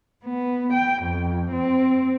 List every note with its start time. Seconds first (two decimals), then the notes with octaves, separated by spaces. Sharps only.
0.25 B3
0.74 G5
1.04 F2
1.51 C4